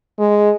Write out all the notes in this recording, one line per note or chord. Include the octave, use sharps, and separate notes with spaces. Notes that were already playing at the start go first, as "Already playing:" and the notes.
G#3